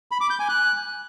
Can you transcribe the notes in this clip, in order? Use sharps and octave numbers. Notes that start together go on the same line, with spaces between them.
B5
D6
G6
G#5
F#6